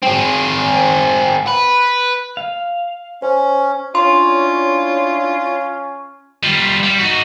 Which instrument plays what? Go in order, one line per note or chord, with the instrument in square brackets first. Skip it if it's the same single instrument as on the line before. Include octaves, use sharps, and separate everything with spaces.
[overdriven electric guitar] C4 G#4
B4
[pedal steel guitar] F5
[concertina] C#4 [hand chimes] C5
[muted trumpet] C#4 [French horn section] D4 E4 C#5 [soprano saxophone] F4 [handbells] C6
[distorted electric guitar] G3 F4
G3
D#4 F#4